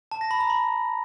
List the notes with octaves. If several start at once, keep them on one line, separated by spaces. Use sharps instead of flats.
A5
A#6
B5
A#5
B5